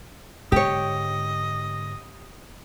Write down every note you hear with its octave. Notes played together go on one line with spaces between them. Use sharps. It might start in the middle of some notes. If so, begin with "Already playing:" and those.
G#2 D3 G4 C#5 D#5